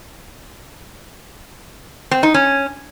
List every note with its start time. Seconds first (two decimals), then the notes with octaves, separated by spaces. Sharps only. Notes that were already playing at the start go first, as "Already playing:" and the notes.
2.11 C4
2.23 D#4
2.34 C#4